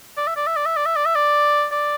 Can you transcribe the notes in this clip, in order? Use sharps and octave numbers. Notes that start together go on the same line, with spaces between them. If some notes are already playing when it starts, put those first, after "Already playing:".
D5
E5
D5
E5
D5
E5
D5
E5
D5
E5
D5
D5